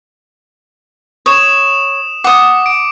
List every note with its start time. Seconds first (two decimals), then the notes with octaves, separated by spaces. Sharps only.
1.26 C#5 D#6 E7
2.24 F#5 D6 D#6 C#7
2.66 D7